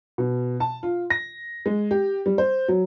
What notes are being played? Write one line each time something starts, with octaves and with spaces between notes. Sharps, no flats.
B2
A5
F4
A#6
G#3
G4
G3
C5
F#3